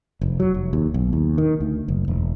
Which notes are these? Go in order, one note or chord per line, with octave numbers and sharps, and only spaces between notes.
F1
F#3
F1
D#2
B1
D#2
D#3
D2
F#1
E1